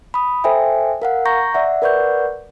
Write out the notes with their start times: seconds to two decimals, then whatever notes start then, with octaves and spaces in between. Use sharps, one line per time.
0.14 B5 D#6
0.44 A4 C5 E5 G5 G#5
1.02 A#4 F5 F#5
1.25 A#5 C#6 G6 A#6
1.54 D5 E5 F#5
1.82 A#4 B4 D5 F#5 C#6 G6